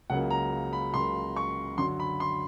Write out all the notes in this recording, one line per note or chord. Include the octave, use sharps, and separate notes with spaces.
C#2 C#3 F#3 A#3 F#5
A#5
B5
C#2 C#3 F#3 A#3 C6
C#6
F#2 D3 F#3 C6
B5
C6